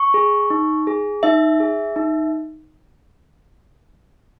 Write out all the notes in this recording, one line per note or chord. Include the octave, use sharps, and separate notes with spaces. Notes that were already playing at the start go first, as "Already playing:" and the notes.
Already playing: C#6
G#4
D#4
G#4
D#4 E5
G#4
D#4